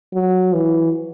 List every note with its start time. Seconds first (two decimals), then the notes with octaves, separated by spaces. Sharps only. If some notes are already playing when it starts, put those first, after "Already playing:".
0.14 F#3
0.54 E3